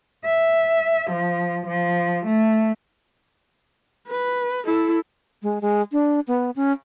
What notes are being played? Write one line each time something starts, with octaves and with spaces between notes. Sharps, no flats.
E5
F3
F3
A3
B4
E4 A4
G#3
G#3
D4
B3
C#4